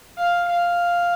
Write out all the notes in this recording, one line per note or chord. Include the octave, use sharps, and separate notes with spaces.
F5
F5